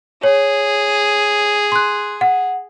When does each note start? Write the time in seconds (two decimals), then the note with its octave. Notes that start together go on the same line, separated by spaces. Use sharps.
0.23 G#4 C#5
1.72 C6 F#6
2.21 F#5